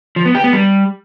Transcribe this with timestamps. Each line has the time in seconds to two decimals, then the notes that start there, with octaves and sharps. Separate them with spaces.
0.16 F3
0.26 B3
0.35 G4
0.44 B3
0.53 G3